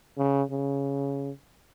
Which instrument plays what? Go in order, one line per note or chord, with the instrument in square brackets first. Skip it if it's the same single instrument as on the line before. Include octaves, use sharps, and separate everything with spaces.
[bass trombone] C#3
C#3